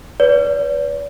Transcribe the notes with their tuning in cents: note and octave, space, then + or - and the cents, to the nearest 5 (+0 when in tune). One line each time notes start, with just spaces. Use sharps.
B4 +0 D5 -45